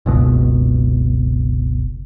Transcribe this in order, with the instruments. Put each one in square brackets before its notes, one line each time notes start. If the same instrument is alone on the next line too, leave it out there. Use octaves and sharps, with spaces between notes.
[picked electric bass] F#1 C#2 B2